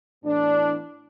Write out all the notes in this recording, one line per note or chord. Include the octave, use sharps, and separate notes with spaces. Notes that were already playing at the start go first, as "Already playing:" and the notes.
A2 E3 B3 D4